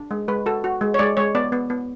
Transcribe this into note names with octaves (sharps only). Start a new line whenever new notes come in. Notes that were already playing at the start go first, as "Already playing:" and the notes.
Already playing: D4
G#3
G#3 B4
F#4 A4
F#4
G#3
C#5
G#3 D5
G#3 C#5
B3 D5
B3
B3